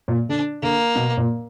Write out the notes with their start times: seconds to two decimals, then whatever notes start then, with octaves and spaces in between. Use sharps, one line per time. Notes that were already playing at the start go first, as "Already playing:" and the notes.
0.08 A#2
0.29 D3 D4
0.62 D3 A#3
0.95 B2
1.17 A#2